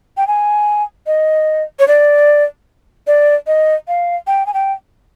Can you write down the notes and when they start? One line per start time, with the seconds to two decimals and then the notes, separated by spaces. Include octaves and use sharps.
0.17 G5
0.27 G#5
1.07 D#5
1.79 C#5
1.88 D5
3.07 D5
3.47 D#5
3.88 F5
4.27 G5
4.47 G#5
4.54 G5